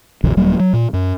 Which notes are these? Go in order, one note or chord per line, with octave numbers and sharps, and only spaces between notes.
A#1 E2 C#3 F3
D#1 F#3 G3 A#3
F#3
A#2
F#2